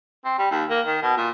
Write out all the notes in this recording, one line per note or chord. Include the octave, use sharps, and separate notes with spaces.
C4
G3
D#2
A#3
D#3
B2
A#2